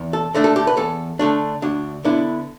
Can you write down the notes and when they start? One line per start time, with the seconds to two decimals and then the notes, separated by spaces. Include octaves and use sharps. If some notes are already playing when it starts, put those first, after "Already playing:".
Already playing: E2
0.13 A4
0.35 D3 A3 D4
0.44 A4
0.56 G4
0.67 B4
0.77 E2 A4
1.19 D3 A3 D4
1.62 D2 D4
2.04 D3 B3 D4 E4